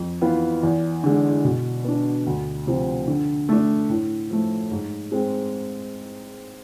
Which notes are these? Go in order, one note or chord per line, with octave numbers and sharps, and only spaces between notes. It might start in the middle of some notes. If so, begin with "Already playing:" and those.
Already playing: F2
E3 B3 F4
E2
D3 G#3
B2
B3 D4
D2
C3 F3
D3
A3 D4
A2
F3 A3
G#2
G#3 C4